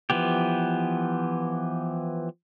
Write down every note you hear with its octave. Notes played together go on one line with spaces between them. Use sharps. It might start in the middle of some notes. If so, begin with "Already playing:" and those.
E3 F3 B3 G4